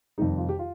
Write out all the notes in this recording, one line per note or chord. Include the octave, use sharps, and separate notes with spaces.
F2 C3 D#3 G3 D#4
F4
G4
F4